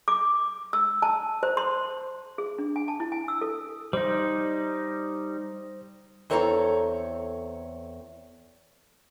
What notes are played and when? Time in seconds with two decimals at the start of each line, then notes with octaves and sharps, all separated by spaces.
0.08 D6
0.73 E6
1.02 A5
1.43 C5
1.57 C6
2.38 G#4
2.58 D4
2.76 G#5
2.88 A5
3.00 E4
3.12 G#5
3.28 E6
3.41 A4
3.93 G3 D#4 C5
6.30 E2 C4 A4 C#5 A5 A#5